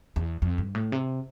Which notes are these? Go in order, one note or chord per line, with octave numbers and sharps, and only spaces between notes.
E2
F2
G2
A2
C3